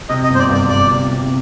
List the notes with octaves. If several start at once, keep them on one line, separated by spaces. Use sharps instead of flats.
C3 D#5
D#5
G1
C5
D5
G1
D5
G1 D5
C3
C3